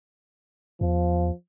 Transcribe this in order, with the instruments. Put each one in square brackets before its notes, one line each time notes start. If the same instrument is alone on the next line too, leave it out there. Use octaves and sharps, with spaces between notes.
[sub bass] E2 [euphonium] F3